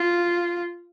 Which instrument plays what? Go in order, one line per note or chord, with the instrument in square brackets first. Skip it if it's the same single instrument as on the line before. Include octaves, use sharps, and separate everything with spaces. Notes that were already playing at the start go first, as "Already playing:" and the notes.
Already playing: [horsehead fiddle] F4